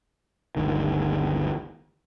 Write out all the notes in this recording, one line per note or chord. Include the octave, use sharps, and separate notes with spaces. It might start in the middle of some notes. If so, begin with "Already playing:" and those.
G1 D2 D#3